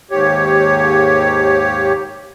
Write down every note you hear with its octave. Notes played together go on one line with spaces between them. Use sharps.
D#2 G#2 G4 C#5